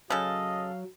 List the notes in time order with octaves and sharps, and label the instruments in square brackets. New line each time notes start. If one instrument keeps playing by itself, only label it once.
[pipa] C#3 A4 [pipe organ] F#3 [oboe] D#5 [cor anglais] F5